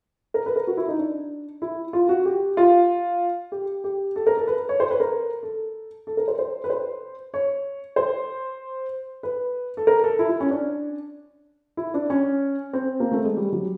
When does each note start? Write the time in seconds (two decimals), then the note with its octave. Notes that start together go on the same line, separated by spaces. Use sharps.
0.34 A#4
0.46 B4
0.56 A#4
0.67 F#4
0.77 E4
0.88 D#4
0.98 D4
1.62 E4
1.93 F4
2.09 F#4
2.25 G4
2.57 F4
3.52 G4
3.84 G4
4.16 A4
4.27 A#4
4.37 A4
4.47 B4
4.69 C#5
4.80 C5
4.91 B4
5.00 A#4
5.43 A4
6.07 A4
6.17 A#4
6.28 C5
6.39 C5
6.64 B4
6.70 C5
7.34 C#5
7.96 C5
9.23 B4
9.77 A4
9.87 A#4
10.04 A4
10.19 E4
10.29 E4
10.40 C#4
10.50 D4
11.77 E4
11.94 D4
12.10 C#4
12.73 C4
13.00 A#3
13.12 A3
13.24 G#3
13.37 G3
13.52 F#3